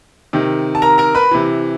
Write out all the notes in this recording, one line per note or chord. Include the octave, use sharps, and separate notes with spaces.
C3 D#3
A5
A#4 A#5
A#4 A#5
B4 B5
C3 E3